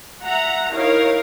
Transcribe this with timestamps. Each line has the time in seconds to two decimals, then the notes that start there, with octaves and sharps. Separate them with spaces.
0.23 E5 F#5 A#5
0.71 D#4 E4 A#4 C#5 F5